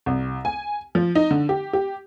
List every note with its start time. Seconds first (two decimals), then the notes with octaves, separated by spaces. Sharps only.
0.06 C2
0.45 G#5
0.95 F3
1.15 D#4
1.31 D3
1.49 G4
1.73 G4